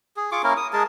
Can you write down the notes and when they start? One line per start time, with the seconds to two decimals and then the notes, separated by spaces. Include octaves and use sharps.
0.17 G#4
0.32 F4 G#4 C#6 D6
0.43 A#3 C#4 E4 A#4
0.57 D#6
0.73 G#3 G#4 A#4 A5